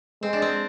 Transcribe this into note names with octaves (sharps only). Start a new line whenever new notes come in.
G#3 C4
D4
C4